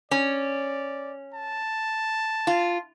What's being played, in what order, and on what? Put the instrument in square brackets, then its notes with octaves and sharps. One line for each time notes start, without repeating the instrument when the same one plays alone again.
[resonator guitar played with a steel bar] C#4 [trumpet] D5
[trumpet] A5
[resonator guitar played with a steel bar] F4